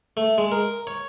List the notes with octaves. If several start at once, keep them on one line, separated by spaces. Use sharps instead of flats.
A3
G#3
A#4
C#5